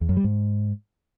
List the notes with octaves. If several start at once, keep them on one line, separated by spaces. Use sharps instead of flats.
E2
F#2
G3
G#2